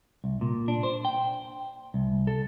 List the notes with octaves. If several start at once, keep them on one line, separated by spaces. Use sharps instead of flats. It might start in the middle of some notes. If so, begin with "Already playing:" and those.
C2
A#2
D4
C5
G5
C2
A4